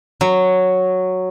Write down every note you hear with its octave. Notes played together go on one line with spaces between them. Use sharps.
F#3